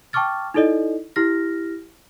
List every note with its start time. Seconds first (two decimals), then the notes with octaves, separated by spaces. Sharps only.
0.13 G5 A5 C#6 D6 F6 A6
0.54 D#4 E4 A4 D5 D#5
1.16 E4 G4 F6 A#6